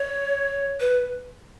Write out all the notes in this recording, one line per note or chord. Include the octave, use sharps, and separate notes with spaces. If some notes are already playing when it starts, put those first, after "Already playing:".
Already playing: C#5
B4